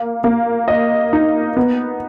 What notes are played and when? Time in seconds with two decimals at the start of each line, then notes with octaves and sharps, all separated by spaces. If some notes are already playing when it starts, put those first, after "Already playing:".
Already playing: A#3
0.24 A#3
0.68 D#5
1.13 D#4
1.57 B3